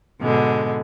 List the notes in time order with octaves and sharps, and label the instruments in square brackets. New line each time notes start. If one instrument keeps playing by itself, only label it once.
[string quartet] G#2 B2 D3 G#3